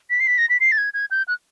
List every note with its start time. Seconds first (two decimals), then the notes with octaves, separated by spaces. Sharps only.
0.10 B6
0.20 C7
0.27 B6
0.38 A#6
0.49 B6
0.60 C7
0.72 A6
0.78 G#6
0.94 G#6
1.11 G6
1.28 F#6